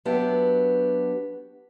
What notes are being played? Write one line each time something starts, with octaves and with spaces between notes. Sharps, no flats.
F#3 B3 D4 G4 E5